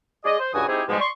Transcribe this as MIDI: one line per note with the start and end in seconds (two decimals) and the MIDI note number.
0.24 0.39 56
0.24 0.39 68
0.24 0.39 74
0.24 0.39 75
0.39 0.49 72
0.53 0.67 37
0.53 0.67 43
0.53 0.67 52
0.53 0.67 66
0.53 0.67 80
0.53 0.67 87
0.67 0.81 56
0.67 0.81 60
0.67 0.81 63
0.67 0.81 64
0.67 0.81 67
0.67 0.81 68
0.88 0.96 44
0.88 0.96 47
0.88 0.96 53
0.88 0.96 55
0.88 0.96 56
1.00 1.09 74
1.00 1.09 84
1.00 1.09 85